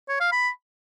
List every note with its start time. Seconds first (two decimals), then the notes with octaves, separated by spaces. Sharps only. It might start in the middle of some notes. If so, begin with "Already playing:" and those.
0.09 C#5
0.20 F5
0.32 B5